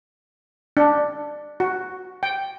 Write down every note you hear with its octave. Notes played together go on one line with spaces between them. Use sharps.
D4
F#4
G5